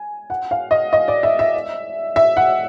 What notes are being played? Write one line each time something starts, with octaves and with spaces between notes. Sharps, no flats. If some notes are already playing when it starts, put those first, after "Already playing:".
Already playing: G#5
F#5
F5
D#5
D#5
D5
E5
E5
E5
F#5